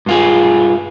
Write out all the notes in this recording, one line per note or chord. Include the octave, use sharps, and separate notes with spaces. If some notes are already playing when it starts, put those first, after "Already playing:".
G2 F4 G#4